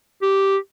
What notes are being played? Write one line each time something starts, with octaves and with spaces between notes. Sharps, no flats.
G4